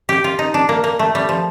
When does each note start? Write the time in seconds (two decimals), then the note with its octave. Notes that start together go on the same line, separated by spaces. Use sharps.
0.09 G4
0.24 F4
0.39 D#4
0.54 D4
0.69 A#3
0.84 A#3
0.99 A3
1.15 G3
1.29 F3